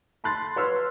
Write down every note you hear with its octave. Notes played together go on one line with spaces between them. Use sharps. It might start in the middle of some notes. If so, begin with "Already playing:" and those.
A5 B5 C6 F#6 A6
B4 C#5 C6 E6 F6